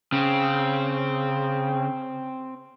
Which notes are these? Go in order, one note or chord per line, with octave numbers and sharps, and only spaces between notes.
C#3 C4